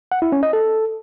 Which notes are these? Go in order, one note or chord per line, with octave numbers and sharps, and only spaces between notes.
F#5
E4
C#4
D#5
A4